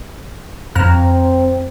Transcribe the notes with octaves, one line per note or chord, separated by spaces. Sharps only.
F2 C4 A#5 F6